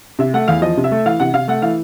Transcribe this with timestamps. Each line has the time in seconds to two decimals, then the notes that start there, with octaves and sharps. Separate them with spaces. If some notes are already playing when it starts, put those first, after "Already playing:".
0.19 C3 E5
0.34 A3 F#5
0.48 E2 F5
0.62 F3 D#5
0.77 C3
0.84 E5
0.92 A3
1.06 E3 F5
1.20 C3 F#5
1.34 C3 F5
1.48 A3 F#5
1.62 E3 F5